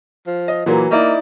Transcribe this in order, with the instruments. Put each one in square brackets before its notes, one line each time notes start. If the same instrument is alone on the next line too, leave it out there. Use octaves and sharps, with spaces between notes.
[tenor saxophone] F3
[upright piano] D#5
[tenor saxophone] A#2 [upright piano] E3 F#3 A#3
[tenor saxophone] A#3 [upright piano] D#4 E4 D5